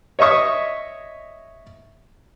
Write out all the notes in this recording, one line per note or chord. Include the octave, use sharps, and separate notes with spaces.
C#5 D#5 E5 C#6 D#6